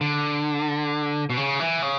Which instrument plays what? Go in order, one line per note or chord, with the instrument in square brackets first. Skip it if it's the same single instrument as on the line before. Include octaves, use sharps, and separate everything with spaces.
[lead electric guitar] D3
B2
C#3
E3
C#3